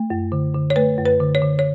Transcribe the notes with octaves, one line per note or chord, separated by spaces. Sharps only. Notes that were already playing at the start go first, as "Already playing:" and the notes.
Already playing: A3
F#2
D3
D3
C#5
A3 B4
F#2
B4
D3
C#5
D3
C#5